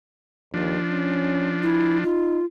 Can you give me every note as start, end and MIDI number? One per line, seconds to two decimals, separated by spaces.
0.54 0.77 39
0.54 2.04 53
0.54 2.04 62
0.90 1.62 61
1.63 1.98 64
2.04 2.39 63
2.04 2.45 65